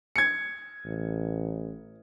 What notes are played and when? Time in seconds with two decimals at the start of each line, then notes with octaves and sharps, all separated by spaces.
0.16 G#6 C#7
0.85 A1